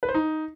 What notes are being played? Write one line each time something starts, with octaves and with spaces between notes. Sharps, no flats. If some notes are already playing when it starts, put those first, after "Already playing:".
B4
C5
D#4